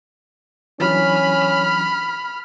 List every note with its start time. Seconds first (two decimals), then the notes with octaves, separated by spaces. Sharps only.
0.80 E3 F#3 C#4 D4 B5 F6